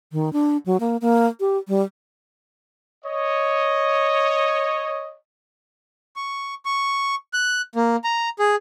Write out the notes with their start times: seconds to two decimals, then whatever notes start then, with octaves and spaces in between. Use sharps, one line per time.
0.12 D#3
0.33 D4
0.66 F#3
0.80 A#3
1.02 A#3
1.40 G4
1.68 G3
3.04 C#5 D#5
6.16 C#6
6.65 C#6
7.33 F#6
7.75 A#3
8.04 A#5
8.39 G#4